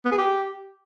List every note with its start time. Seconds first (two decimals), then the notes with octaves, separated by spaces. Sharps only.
0.05 B3
0.12 G#4
0.18 G4